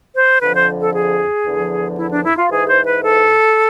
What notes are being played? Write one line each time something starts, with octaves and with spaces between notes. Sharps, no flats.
C5
F2 D3 F3 B4
C5
A4
G#4
E2 D3 F3
E4
D4
E4
F4
G#2 E3 G#4
C5
B4
A4